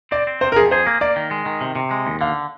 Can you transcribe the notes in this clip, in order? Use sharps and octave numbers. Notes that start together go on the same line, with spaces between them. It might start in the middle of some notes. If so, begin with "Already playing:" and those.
C4 D5
C4
C3 C5
A#4
F2 G#4
G#4 C5
A#3
A#3 D5
D#3
G#3
D#3
C3
C3
G#3
D#2
D3 F5